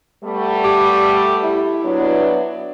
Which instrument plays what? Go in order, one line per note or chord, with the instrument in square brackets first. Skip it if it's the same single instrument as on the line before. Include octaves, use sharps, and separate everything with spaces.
[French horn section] G3 A3 B3
[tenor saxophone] G4
E4
[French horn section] F#3 B3 D4